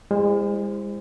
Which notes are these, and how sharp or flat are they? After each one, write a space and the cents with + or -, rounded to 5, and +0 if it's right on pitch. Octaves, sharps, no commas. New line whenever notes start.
G#3 -40 E4 +10 C5 +0